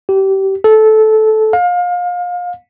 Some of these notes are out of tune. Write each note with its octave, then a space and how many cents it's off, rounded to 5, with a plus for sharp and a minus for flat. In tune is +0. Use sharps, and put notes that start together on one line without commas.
G4 -25
A4 -15
F5 +30